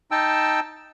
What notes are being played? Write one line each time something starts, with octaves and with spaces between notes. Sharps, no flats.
D#4 G5 A5 E6